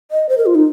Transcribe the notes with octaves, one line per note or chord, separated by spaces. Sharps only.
D#5
C5
A#4
F4
D#4